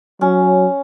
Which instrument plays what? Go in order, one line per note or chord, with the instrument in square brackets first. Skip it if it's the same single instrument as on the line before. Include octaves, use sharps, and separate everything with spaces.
[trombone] F#3 [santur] C#4